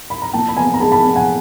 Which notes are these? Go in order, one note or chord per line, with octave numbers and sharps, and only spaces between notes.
B5
A#5
A#2 G5 A5
B5
B3 G#5 A#5
A#5
G#3 A5 B5
A5 B5
B3
F#5 G#5